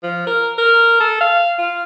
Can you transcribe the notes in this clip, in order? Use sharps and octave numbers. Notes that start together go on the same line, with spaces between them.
F3
A#4
A#4
A4
F5
F4